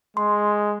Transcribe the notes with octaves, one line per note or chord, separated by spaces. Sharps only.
G#3 C6